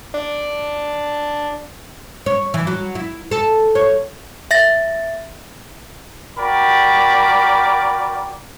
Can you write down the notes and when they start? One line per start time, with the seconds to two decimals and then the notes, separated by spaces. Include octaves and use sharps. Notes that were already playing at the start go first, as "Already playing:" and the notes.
0.14 D4
2.26 C#5
2.54 E3
2.67 F#3
2.95 E4
3.31 A4
3.75 C#5
4.51 E5 A6 A#6
6.38 F#4 A#4 D5 G5 B5